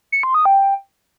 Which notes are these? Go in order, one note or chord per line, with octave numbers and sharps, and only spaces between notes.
C#7
C6
D#6
G5